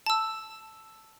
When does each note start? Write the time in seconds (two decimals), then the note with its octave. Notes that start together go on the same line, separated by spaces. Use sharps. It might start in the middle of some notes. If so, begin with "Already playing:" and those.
0.06 A5 E6